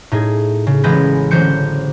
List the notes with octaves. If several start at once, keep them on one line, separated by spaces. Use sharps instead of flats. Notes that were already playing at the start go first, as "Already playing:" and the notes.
A2 D#4 G#4
C#3
A1 E3 G#3 B4 G6 A#6
A1 D3 F#3 C5 G6 C#7